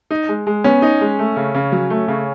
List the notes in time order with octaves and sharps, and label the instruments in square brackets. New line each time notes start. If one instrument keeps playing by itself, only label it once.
[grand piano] D#4
G#3
G#3
[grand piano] B3 [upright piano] C#4
[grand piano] D#4
G#3
A3
C#3
C#3
F#3
A3
C#3